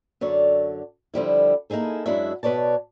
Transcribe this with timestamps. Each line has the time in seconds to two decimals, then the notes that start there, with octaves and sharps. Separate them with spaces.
0.21 F#2 D3 C#5 D5
1.14 D3 F3 G3 E4
1.70 A#3 D#4 E4 G#4 A4
2.06 F#2 G#3 D4 E4 F#4 E5
2.43 B2 B4 C#5 D5 A5